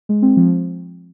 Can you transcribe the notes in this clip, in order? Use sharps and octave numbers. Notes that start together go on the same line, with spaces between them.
G#3
C4
F3